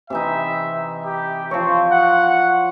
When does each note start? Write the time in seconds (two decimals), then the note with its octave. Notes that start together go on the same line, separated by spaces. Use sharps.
0.10 C3 E3 D#4 E5
1.05 G4
1.51 F3 C4 C#5
1.92 F#5